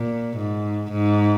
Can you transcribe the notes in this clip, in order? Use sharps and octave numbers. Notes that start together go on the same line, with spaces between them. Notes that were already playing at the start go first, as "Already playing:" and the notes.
Already playing: A#2
G#2
G#2